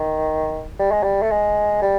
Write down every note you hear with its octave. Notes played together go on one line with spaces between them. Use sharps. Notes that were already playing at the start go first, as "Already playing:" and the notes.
Already playing: D#3
G3
G#3
G3
A3
G#3
G3